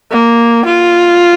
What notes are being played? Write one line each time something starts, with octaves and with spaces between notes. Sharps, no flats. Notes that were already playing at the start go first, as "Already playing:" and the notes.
A#3
F4